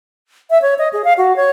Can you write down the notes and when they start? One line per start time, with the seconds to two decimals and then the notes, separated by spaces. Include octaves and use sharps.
0.50 E5
0.62 C#5
0.78 D#5
0.93 G#4
1.04 F5
1.18 F#4
1.36 C#5